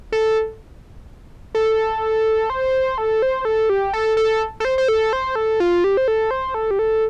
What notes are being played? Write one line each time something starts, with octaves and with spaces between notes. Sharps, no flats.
A4
A4
C5
A4
C5
A4
G4
A4
A4
A4
C5
C5
A4
C5
A4
F4
G4
C5
A4
C5
A4
G4
A4